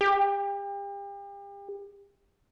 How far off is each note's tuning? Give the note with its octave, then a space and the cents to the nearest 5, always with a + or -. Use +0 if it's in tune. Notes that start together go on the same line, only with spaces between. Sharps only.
G4 +35